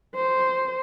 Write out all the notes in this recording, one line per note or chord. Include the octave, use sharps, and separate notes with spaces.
C5